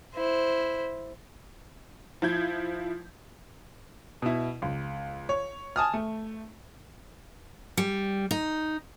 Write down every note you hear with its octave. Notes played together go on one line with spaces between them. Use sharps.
E4 C5
F3 E4 G6 G#6
B2 E4
C#2
C#5
G#5 A5 D#6 F6
A3
G3
D#4